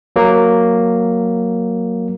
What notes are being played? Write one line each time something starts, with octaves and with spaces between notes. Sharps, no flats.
F#3 A#3